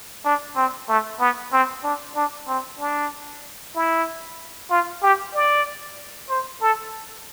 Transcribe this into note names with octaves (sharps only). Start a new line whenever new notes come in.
D4
C4
A3
B3
C4
D4
D4
C4
D4
E4
F4
G4
D5
C5
A4